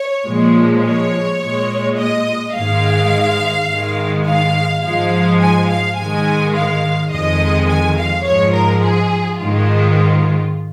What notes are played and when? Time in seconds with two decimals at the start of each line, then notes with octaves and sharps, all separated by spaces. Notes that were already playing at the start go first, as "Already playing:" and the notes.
Already playing: C#5
0.26 A#2 F3 G#3
0.83 C#5
1.40 A#2 G#3
1.98 D#5
2.55 G#2 D#3 G#3 F5
3.69 G#2 D#3 G#3
4.26 F5
4.83 G#2 F3 G#3 F5
5.40 G#5
5.69 F5
5.97 G#2 D#3 G#3 G#5
6.54 F5
7.11 F2 D#3 G#3 D#5
7.69 G#5
7.97 F5
8.25 G#2 F3 G#3 C#5
8.54 A#4
8.82 G#4
9.40 G#2 D#3 G#3 F4